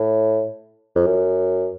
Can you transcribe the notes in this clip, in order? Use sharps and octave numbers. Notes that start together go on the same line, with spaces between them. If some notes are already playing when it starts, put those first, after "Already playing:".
Already playing: A2
F2
F#2